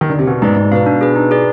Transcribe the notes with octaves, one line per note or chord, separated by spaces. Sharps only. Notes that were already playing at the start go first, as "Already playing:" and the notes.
D#3
D3
C3
B2 B3
G#2 D#4 B4 D5
G#2 D#4
B2 B4 F5
D4
G#4 B4
D#4
G#4 B4 D5